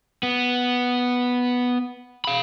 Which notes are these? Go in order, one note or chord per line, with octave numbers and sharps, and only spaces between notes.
B3
F5 B5